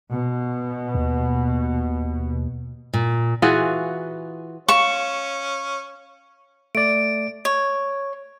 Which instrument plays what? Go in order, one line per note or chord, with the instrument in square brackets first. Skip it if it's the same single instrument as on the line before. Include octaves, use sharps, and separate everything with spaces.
[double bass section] B2
[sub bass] D#2
[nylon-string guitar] A#2
[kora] E3 F4 F#4 G#4
[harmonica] C#4 [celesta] F5 E7 [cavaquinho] C#6
[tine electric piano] A3 D5 [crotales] D7
[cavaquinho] C#5